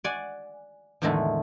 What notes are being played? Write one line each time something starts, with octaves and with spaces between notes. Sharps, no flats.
D5 F#5 G#5
E2 A2 D3 D#3 G#3 A3